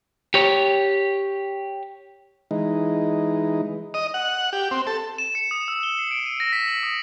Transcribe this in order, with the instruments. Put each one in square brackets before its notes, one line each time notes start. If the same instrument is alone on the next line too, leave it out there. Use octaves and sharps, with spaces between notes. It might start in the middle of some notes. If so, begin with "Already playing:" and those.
[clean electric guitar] G4 C#5
[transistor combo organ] E3 G#3 D#4
D#5
F#5
G4
C4
A4
[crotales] E7
C#7
D#6
E6
G7
C7
D7
D#7
A#6
B6
F#7
D#6